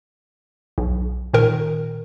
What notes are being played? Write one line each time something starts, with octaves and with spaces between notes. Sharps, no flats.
B1
A#2 D#3 A#4